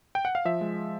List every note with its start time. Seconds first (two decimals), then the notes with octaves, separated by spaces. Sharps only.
0.15 G5
0.25 F#5
0.35 F5
0.45 F3 E5
0.61 G#3